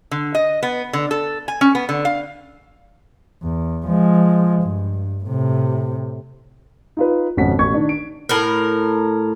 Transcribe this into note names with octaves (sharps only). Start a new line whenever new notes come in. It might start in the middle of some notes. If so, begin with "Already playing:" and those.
D3
D#5
B3
D3
A4
G#5
C#4
B3
D3
F5
E2
F3 G#3
G2
A2 C3
D#4 F4 B4
G#1 F2 B2 C#4 F#5 B6
A1 B2 C#6 G#6
D#3 D4
D7
A2 A#4